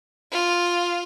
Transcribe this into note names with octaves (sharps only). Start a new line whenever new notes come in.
F4